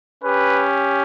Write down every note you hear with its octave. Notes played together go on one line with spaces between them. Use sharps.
C#4 G4 B4